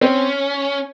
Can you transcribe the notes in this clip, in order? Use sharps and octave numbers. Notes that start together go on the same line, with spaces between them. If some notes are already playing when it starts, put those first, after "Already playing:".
C4 C#4